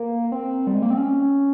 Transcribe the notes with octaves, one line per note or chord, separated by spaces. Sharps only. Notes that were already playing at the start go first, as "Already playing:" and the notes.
Already playing: A#3
C4
G3
G#3
A#3
C4
C#4